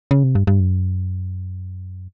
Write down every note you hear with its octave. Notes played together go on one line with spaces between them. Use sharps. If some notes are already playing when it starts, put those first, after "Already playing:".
C#3
C3
G2
G2
F#2